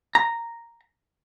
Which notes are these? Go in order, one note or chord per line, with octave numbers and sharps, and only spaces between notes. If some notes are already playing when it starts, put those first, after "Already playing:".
A#5